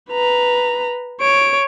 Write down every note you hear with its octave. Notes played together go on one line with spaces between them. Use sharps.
B4 A#5
C#5 D7